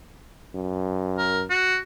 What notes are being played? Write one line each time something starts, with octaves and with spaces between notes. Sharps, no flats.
F#2
A#4
F#4